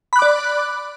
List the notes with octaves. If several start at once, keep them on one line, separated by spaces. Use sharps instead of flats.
D5 B5 D6 F#6